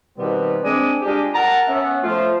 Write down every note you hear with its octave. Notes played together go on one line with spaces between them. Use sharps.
B2 D#3 G3 B3 C4
G#3 C4 D4
G#3 D4 F4 G4
A#4 F#5 A5 A#5
B3 C#4 C#5 E5
F3 A3 F4 A4 C5